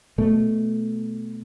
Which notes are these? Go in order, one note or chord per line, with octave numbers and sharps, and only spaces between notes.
B2 A3